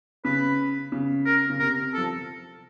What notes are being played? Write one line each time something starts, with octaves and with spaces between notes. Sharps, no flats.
C#3 B4
C#3
A#4
C#3
C3 A#4
F3 A4